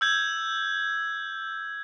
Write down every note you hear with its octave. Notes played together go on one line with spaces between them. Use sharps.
E6 G6 G#6